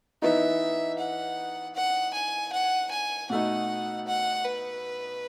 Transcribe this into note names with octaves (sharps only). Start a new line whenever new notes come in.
E3 B3 D#4 E5
F#5
F#5
G#5
F#5
G#5
B2 A3 D#4 F#5
F#5
B4